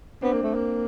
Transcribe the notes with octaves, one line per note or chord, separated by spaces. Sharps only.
B3 C4 D4
A#3
A3
A#3